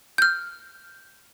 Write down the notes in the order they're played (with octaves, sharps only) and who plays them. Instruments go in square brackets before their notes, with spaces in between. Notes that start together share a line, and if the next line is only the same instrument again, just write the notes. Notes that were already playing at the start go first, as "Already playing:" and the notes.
[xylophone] F6 G6